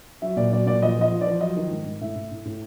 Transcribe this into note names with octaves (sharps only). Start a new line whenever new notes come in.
F#3 E5
A#2 D5
F#3 D5
A#2 D5
F3 D#5
F3 D#5
F3
D5
F3
F#3 D#5
D#3
G#2
G#2
A2 E5
A2
A2
A2